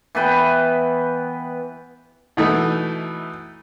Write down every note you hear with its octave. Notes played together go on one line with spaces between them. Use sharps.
E3 B3 B4 G5
B2 E3 A3 D#4